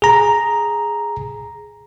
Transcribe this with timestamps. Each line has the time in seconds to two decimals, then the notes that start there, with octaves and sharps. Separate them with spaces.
0.02 G#4 A#5